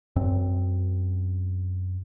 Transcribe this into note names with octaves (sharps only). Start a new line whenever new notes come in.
F#2 C4